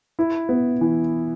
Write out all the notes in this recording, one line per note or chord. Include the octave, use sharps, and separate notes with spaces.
E4
B3
E3